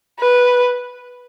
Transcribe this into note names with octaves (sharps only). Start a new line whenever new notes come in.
B4